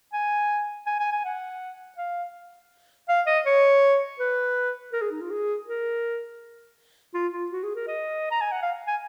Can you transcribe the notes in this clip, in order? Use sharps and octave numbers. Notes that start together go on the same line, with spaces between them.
G#5
G#5
G#5
G#5
F#5
F5
F5
D#5
C#5
B4
A#4
G#4
D#4
F4
G#4
A#4
F4
F4
F#4
G#4
A#4
D#5
A#5
G#5
F#5
F5
G#5